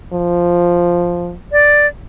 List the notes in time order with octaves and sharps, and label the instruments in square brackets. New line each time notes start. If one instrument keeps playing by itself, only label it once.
[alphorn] F3
[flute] D5